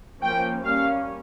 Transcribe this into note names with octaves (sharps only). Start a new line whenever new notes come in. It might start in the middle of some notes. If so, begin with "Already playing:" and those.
F3 A#3 C#4 G5
G3 A#3 C#4 F5